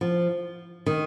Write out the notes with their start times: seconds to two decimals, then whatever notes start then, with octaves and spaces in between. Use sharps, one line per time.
0.01 F3
0.86 D#3